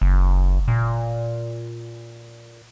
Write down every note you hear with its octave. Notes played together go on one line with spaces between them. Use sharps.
F#1
A#2